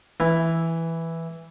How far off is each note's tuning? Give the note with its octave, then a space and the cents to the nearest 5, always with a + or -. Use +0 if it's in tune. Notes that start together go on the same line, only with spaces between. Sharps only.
E3 +0 E4 +0